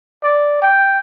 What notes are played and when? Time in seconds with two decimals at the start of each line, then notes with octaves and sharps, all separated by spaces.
0.23 D5
0.62 G5